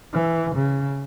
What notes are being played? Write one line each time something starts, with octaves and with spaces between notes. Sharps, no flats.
E3
C#3